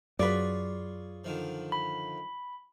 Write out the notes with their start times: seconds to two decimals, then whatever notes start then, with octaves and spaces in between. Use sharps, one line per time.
0.19 F#2 F4 G#4 B4 C#5 D5
1.24 D3 D#3 F3
1.72 B5